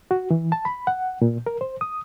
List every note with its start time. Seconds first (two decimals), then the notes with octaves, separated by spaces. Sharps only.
0.11 F#4
0.31 E3
0.52 A5
0.65 B5
0.87 F#5
1.22 A#2
1.46 A#4
1.61 C5
1.81 D#6